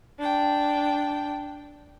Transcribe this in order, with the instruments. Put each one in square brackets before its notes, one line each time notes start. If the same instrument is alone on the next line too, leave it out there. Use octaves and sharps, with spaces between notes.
[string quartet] D4 G5